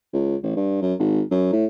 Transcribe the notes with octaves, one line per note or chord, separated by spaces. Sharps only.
C#2
A1
G2
F#2
G#1
F#2
A2